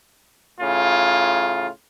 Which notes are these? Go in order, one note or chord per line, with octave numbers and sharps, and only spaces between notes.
A2 C#3 F4